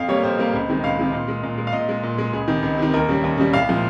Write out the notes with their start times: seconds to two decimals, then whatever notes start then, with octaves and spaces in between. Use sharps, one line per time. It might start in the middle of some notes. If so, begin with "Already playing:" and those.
Already playing: F2 F5
0.08 C3 G3 A#3 C#5
0.23 F2 C5
0.38 C3 G3 A#3
0.53 C#2
0.69 C3 D#3 G#3
0.83 C#2 F5
0.99 C3 D#3 G#3
1.13 A#2
1.28 G#3
1.43 A#2
1.58 G#3
1.67 F5
1.73 A#2 D#5
1.89 G#3
2.03 A#2
2.18 G#3
2.33 C#2 G#4
2.48 C3 D#3
2.63 C#2
2.78 C3 D#3
2.93 D#2 A#4
3.08 C#3 G3
3.24 D#2
3.38 C#3 G3
3.53 C2 F5
3.69 A#2 F3 G#3